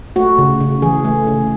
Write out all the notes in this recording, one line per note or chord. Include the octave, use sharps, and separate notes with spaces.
A3 F#4
C#3
C#3
E3 G#4
A3
C#3